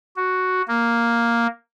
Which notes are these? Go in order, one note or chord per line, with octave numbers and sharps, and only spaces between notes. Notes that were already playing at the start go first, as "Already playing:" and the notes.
F#4
A#3